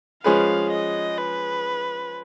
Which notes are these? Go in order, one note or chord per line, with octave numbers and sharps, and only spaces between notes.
F3 G#3 C#4 G#4 B4 F5
D#5
B4